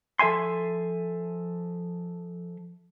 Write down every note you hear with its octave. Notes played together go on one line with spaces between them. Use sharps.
F3 A4 E5 G#5 C6